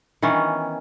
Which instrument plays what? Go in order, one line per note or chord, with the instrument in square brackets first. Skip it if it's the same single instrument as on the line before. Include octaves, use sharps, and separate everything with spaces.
[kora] D#3 E3 B3 C#4